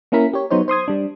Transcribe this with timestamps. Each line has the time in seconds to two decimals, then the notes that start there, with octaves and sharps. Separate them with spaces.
0.12 A#3 C#4 E4 A#4 B6
0.33 G4 C#5
0.50 F#3 B3 D#4 C5 C#5
0.68 C5 C6 D#6 G#6
0.88 G3 D4